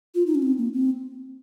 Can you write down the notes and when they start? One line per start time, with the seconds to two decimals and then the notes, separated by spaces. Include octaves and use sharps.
0.15 F4
0.27 D#4
0.35 C#4
0.42 C4
0.58 A#3
0.73 C4